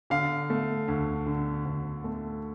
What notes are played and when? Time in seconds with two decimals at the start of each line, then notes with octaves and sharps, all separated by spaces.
0.10 D3 F5
0.50 A3
0.88 D2
1.26 D3
1.65 D2
2.04 A3